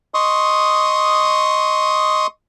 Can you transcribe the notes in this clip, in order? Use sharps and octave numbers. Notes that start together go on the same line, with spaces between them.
D#5 C6 C#6 D#6